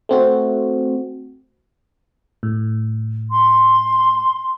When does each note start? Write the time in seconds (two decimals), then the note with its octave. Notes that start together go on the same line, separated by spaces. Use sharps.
0.09 A3 C4 F#4
2.43 A2
3.30 C6